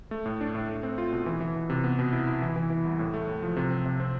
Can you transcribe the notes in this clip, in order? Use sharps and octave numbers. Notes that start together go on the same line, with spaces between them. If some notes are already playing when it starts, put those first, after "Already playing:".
A3
A2
D4
A2
A3
C4
F4
B2
E3
E3
E3
C3
B3
B2
E4
E4
E3
E3
E3
C2
A2
A3
A2
F3
C3
C4
C3
C4